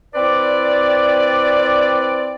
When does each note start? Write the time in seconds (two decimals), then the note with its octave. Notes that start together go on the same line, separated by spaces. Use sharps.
0.14 C4 E4 B4 D5